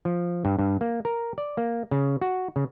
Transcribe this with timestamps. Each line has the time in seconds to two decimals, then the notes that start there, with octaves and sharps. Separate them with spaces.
0.05 F3
0.45 G2
0.59 G2
0.81 A#3
1.05 A#4
1.38 D5
1.57 A#3
1.91 C#3
2.21 F#4
2.56 C#3